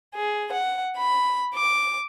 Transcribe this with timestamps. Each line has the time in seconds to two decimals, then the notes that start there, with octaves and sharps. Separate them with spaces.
0.14 G#4
0.52 F#5
0.97 B5
1.55 D6